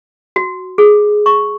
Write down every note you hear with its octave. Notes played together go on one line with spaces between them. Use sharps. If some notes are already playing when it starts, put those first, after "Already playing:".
F#4
G#4
C#6